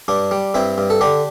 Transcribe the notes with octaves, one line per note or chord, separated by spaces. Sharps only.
G2 D4
G3
G2 C4 E4
G2
A4
D3 D4 G4